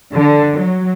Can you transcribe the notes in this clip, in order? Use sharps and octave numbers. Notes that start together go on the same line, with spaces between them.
D3
F#3